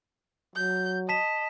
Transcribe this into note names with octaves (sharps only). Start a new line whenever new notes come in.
F#3 G6
D#5 A5 B6 E7